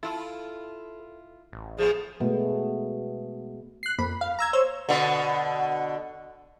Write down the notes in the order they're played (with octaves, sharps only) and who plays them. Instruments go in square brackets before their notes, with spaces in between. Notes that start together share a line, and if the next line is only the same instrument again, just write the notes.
[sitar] E4 F4 [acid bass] A4
[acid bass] A1
[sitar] F3 A3 B3 [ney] G#4
[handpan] B2 G#3 A3 B3
[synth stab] F#6 C7
F2 A#3 B5
F5
A#5 E6 G#6
C5 C#5 E6
[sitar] B2 D3